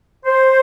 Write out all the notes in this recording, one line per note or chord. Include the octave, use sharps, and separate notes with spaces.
C5